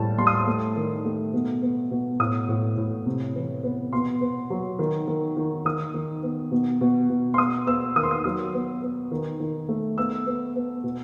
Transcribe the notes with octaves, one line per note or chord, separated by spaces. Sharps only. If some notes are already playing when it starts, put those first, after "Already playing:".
Already playing: A2 G3 A5
G3 C6
D#6
C6
A3
D#3
A3
B2
B3
B2
A2 D#6
A2
A2
C3
E3
B3
B2 C6
B3
F#3
D#3
D#3
D#3
D#3 D#6
D#3
B3
B2
B2
B2
C6
B3 D#6
B3 E6
D#3 D#6
C6
D#6
F#3 D#6
B3
B3
D#3
D#3
A3
B3 E6
B3
B3
B2